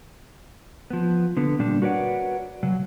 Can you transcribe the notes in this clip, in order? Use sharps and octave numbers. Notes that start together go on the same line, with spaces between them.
F3 B3
D3 B3
A#2 G3 D4
F#4 A#4 B4 C#5 D5 F#5
C#3 F#3